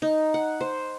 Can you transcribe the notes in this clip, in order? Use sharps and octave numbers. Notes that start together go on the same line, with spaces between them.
D#4
F#5
C5